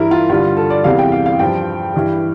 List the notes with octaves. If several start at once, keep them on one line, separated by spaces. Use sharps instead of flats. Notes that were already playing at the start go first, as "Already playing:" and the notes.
Already playing: G2 E3 G3 E4 A#4
F4
G2 D3 G3 F4
A4
D5
E2 C3 E3 G3 F5
G5
F5
F5
G2 F3 G5
G2 E3 G3